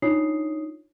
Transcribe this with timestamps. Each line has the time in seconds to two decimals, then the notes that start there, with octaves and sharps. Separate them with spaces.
0.02 D4 D#4 F4 C#5 D#6 C7